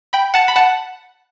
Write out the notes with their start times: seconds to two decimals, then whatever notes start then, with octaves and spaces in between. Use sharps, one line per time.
0.13 G5 B5
0.34 F#5 A5
0.48 B5
0.56 F#5 A5